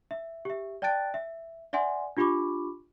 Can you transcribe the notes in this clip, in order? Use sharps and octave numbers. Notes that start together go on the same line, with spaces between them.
E5
G4 E5
D5 G5 A5 F#6 A6 D7
E5
D5 E5 F#5 G#5 C6
D4 F4 G4 B5 C#6 D6